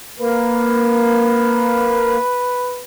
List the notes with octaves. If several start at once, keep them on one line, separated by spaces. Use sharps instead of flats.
A#3 B4